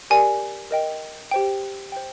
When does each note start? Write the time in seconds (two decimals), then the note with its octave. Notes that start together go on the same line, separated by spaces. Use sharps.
0.10 G4 A#4 D5 G#5
0.71 A#4 D#5 G5
1.31 G4 C5 G5
1.92 C5 G5